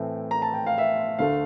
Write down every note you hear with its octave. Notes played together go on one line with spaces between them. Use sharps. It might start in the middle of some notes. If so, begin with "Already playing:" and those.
Already playing: A2 E3 A3 C4
A#5
A5
G5
F5
E5
D2 D3 A3 F5